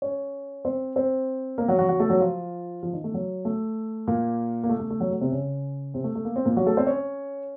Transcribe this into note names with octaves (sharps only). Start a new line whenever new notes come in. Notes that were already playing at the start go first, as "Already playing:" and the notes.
C#4 C#5
C4 C5
C4 C5
A#3 A#4
F#3 F#4
F#3 F#4
F#3 F#4
A3 A4
F#3 F#4
F3 F4
F3 F4
D#3 D#4
A3
F#3
A3
A#2 A#3
A#3
A3
A3
A3
F#3
A3
C3 C4
C#3 C#4
C3 C4
A3
A3
A#3
C4
A#2 A#3
F#3 F#4
A3 A4
C4 C5
C#4 C#5